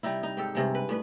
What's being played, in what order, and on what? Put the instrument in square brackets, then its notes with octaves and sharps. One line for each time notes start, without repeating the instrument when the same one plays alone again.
[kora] C3 G3 D#4 E4
D#4
G#2 G4 A4
G2 C3 G#3
B4
A2 D4 B4